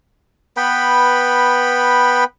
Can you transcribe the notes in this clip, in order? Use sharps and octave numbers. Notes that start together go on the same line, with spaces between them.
B3 B4 G5 B5